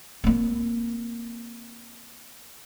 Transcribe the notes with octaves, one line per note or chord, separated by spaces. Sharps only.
A#3 C4